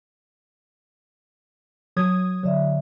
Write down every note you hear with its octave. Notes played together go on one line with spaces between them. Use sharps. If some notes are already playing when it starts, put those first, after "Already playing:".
F#3 D#6 G#6
D3 F#3 D5 E5